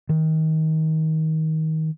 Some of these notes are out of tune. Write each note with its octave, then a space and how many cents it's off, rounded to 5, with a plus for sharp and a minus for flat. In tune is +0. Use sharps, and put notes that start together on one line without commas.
D#3 +25